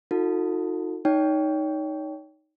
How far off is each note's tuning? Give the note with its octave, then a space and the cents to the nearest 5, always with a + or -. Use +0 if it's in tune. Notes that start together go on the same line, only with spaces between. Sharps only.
D#4 +20 F#4 -45 A4 +25
D#4 +0 C#5 +30 G5 +0